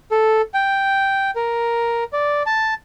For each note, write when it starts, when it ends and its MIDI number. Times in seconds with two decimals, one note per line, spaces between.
0.11 0.42 69
0.54 1.31 79
1.36 2.04 70
2.13 2.43 74
2.46 2.74 81